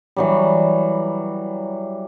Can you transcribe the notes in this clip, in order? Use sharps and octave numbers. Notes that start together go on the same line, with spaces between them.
E3 F#3 G3